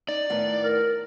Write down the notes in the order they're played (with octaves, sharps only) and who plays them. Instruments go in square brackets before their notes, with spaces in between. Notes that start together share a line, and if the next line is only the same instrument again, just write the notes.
[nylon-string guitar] D#4 [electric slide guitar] D5
[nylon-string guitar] A2 D#3 B3
[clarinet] A#4